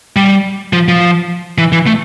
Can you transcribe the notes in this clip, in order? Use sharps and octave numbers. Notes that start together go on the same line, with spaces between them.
G3
F3
F3
E3
E3
A3